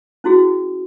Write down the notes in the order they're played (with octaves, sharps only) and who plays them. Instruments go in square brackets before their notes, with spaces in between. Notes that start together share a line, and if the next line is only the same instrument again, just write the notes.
[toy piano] C#4 E4 F#4 G#4